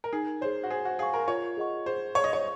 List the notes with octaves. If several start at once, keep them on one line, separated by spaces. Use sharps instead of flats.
A#4
D#4 G#4
G#4 C5 C#5
F#4
G#4 C5
F#4
G#4 F5 G#5 C#6
A#4
F4 C#5
G#4 D#5 F#5 C#6
G#4 C5
C5 C#5 F5
D#5
C#5